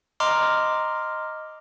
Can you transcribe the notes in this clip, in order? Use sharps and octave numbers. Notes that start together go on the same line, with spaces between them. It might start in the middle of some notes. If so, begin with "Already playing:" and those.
D#5 A#5 C6 D6 F6